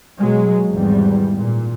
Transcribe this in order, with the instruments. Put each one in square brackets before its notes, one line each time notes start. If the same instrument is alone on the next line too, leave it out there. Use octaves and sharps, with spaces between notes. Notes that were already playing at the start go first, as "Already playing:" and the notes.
[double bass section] B2 F#3 G#3
G#1 E2 G3
A#2